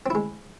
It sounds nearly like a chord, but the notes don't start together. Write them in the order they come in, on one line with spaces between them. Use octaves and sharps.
C4 E4 G#3